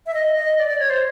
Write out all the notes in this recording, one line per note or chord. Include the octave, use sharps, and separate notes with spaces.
E5
D#5
D#5
D5
D5
C#5
C5